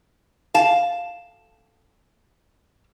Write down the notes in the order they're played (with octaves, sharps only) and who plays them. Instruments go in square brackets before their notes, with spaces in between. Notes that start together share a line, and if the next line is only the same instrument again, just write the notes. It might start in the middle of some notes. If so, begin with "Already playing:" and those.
[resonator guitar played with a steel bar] F5 A5